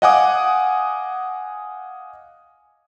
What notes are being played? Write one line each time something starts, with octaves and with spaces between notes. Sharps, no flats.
D#5 F5 F#5 G#5 D6 D#6